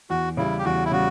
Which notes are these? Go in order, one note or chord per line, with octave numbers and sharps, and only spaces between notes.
E2 F#4
C#3 G3 C#4 E4
G4
E2 F#4
E4
C#3 G3 F#4